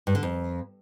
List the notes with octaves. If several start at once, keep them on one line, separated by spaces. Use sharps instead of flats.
G2
D3
F2